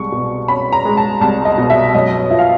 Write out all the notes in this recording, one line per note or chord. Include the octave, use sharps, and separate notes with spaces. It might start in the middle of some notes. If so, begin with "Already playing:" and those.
Already playing: C2 G#3 C#6
B2
C#4 B5
A#5
G#3
A5
C2 A5
D#5
B2
E5
F#2 D#5
F3 E5
F5